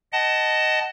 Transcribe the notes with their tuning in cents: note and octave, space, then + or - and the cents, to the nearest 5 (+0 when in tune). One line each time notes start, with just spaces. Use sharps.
D#5 -5 F#5 +30 A5 +0